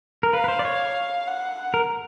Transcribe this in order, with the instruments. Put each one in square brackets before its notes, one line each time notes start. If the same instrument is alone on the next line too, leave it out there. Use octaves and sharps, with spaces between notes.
[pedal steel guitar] A#4
[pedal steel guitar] B4 [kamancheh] F5
[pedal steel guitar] B4
C5
D5
C#5
[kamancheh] F#5
[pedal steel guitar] A#4